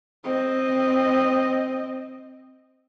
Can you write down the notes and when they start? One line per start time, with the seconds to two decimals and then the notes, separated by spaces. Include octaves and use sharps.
0.24 C4 D#5